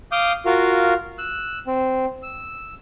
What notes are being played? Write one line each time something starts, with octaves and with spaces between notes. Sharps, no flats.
F5 D6 D#6 G6
F4 F#4 A#4 F5
E6 F#6
C4
E6